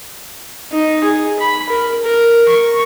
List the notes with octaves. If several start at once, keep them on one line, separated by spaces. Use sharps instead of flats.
D#4
G#4
B5
A#4
A#4
C#6